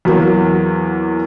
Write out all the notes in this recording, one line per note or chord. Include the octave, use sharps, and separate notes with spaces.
E2 F#3 A#3